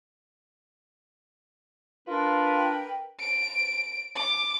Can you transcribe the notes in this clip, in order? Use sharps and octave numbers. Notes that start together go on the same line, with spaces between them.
D4 F4 A#4 B4
G5
D7
D6